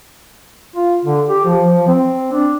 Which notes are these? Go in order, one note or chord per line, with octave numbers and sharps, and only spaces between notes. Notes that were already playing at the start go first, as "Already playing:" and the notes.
F4
D3
G4
F3
F3
C4
D4